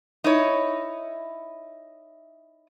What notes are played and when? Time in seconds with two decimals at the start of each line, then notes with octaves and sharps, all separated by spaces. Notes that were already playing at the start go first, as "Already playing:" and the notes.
0.24 D#4 E4 C#5